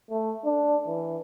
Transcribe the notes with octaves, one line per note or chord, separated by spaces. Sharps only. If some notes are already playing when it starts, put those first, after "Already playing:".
A3
D4
E3